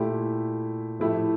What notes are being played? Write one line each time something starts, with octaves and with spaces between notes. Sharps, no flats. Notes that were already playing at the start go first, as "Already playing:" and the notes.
Already playing: A#2 A3 E4 G4
A2 F3 A3 E4 G4